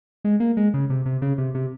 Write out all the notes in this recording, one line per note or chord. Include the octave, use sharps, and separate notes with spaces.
G#3
A#3
G#3
C#3
C3
C3
C#3
C3
C3